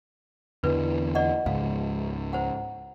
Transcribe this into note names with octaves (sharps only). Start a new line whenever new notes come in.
E2 D3 E3 B4
D5 D#5 F#5
C#2 G#2 F5
E4 C5 F#5